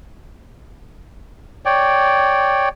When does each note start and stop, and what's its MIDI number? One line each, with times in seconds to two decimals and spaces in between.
1.65 2.69 73
1.65 2.69 74
1.65 2.69 79